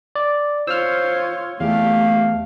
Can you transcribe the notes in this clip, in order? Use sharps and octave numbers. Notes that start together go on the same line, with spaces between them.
D5
F4 C5 C#5 E6 F6
E2 A3 G4 F5